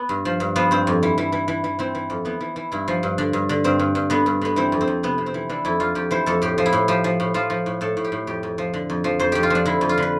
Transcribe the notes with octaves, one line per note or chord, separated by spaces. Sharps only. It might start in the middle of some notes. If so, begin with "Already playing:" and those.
Already playing: B3
G2
F3
G2
F3 B3
G2 C4
F2
E3
E3
E3
E3
E3
E3 C4
E3
F2
E3 B3
E3
E3
G2 E4
F3
G2
D3 D4
G2
D3
G2 C4
G2
G2
D3 B3
G2
D3 B3
E3 C4
F2
C4
F2
C3 B3
C3
C4
E3
E3 D4
F2 E4
F2 F4
F2 G4
E3 C5
F2 A4
A2 G4
F3
E4
A2
F3 G4
F3
A2
F3 F4
F3
A2
A2 A4
A2
G4
A2
F2 G4
F2
F3
D3
F2
F3
F2 C5
F2 G4
F4
F3 D4
D3 E4
F2
F4
D3 B4